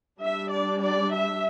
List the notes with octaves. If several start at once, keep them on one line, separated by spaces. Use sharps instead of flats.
G3 D4 E5
D5
D5
E5